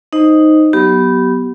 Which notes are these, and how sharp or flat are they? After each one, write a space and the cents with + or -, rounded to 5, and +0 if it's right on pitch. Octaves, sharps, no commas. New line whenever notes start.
D#4 +0 C5 +0 D#5 +0
F#3 +0 B3 +0 G4 -25